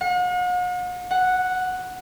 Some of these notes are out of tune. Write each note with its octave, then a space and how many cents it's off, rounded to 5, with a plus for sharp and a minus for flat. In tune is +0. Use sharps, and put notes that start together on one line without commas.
F#5 -45
F#5 -5